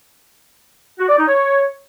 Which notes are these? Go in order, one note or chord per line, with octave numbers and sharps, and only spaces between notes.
F#4
D5
D#4
C#5